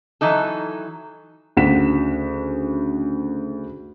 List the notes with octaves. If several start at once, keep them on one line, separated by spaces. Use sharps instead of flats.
E3 F#3 D#4 A4
D2 C#3 F#5 B6 E7